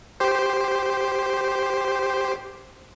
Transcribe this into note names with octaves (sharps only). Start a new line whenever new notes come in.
G4 C5